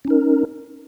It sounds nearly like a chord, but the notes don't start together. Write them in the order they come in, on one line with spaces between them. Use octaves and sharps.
C#4 D#4 A#4